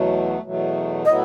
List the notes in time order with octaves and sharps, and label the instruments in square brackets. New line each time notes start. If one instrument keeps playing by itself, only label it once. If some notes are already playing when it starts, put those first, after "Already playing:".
Already playing: [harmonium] E2 B2 F#3 A3
E2 B2 F#3 A3
[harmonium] A2 F#3 B3 E4 [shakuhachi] D#5